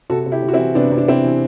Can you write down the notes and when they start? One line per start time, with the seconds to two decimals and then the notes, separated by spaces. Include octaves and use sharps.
0.10 C3 F#4 A4
0.26 C3
0.32 E4 G4
0.43 C3
0.48 F#4
0.53 C4 E4
0.58 E3
0.75 C3 B3 D4
0.91 C3
0.98 D4
1.08 C3 C4 E4
1.24 E3